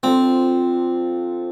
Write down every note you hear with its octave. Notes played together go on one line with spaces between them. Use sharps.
F3 C4 D4 F4 A4